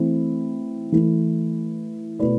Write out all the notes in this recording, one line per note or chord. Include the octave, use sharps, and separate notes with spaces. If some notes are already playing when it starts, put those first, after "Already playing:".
Already playing: E3 A3 C4 E4
E3 A3 E4
B2 A3 E4 B4 D5